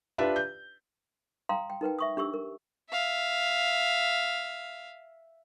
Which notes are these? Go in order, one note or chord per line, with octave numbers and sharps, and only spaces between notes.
D4 F4 G4 B4 D5 E5
G6
F5 G5 A#5 C6 D#6
G5
D#4 A#4 B4 G5
E5 C#6 D#6
D4 G4 C#6 E6
A#4
E5 F5